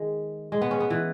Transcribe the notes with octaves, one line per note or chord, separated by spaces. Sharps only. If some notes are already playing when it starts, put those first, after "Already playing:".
Already playing: D#3 G#3
G#3
B3
C#4
B3
E3